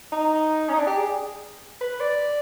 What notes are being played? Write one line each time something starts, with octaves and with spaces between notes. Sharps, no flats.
D#4
C#4
D#4
D4
G4
G#4
B4
D5